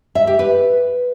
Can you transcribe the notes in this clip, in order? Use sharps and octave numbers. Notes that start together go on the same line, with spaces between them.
E5
G4
B4